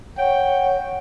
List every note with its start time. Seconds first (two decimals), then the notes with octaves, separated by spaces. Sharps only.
0.17 C#5 F#5 G5